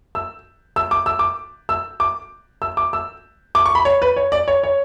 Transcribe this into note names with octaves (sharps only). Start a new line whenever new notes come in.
E6
E6
D6
E6
D6
E6
D6
E6
D6
E6
D6
C#6
B5
C#5
B4
C#5
D5
C#5
C#5